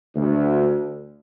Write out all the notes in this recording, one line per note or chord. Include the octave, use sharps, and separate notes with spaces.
D2